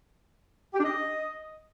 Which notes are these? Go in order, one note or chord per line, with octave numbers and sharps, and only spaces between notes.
G4
D4
D#5